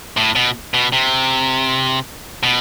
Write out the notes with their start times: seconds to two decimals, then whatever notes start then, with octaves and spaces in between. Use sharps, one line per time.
0.17 A2
0.35 B2
0.74 B2
0.92 C3
2.43 B2